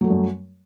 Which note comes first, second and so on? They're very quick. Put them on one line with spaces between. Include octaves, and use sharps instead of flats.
F#3 A3 G3 F#2